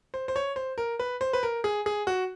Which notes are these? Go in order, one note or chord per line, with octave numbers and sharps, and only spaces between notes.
C5
C5
C#5
C5
A#4
B4
C5
B4
A#4
G#4
G#4
F#4